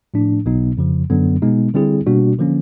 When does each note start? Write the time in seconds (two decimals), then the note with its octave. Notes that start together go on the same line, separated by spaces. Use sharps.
0.14 A2 F3 A3 D4
0.46 B1 B2 F#3 B3 D#4
0.77 F2 C#3 F3
1.10 F#2 D3 F#3 B3
1.42 B2 G#3 B3 D#4
1.74 D3 G3 C4 E4 G#4
2.06 B2 G3 A#3 D4 F#4
2.39 D3 F3 A#3 C#4